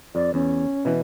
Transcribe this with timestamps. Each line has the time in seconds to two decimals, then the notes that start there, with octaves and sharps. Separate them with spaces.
0.15 F2 D5
0.34 E2 C#4
0.85 B2 E3